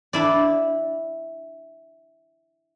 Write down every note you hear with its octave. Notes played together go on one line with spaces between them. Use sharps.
D4 E4 D5